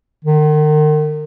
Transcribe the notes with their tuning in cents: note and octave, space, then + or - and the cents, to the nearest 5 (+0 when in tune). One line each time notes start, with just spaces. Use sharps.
D#3 -40